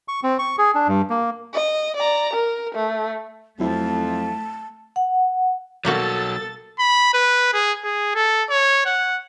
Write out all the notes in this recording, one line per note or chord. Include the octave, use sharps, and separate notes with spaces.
C#6
C4
C#6
G#4
D4
G2
A#3
D#5
D5 A#5
A#4
A3
F2 F#3 A3 E4 A5
F#5
B2 F#3 G3 A#3 F#4 A4 A6
B5
B4
G#4
G#4
A4
C#5
F#5